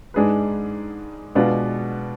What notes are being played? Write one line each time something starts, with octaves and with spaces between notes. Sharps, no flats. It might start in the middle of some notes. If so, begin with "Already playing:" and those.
G#2 G#3 D4 G#4 B4
B2 G#3 B3 D4 F4